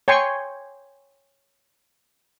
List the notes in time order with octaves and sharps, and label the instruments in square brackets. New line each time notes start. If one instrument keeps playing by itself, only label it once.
[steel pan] C#5 G5 G#5 C6 C#6